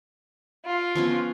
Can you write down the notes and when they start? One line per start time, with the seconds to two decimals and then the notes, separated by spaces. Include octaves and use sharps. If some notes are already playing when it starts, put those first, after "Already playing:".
0.66 F4
0.95 F3 B3 C#4